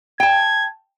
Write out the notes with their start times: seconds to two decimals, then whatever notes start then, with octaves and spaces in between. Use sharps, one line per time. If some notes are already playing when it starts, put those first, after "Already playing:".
0.20 G5 A5 G#6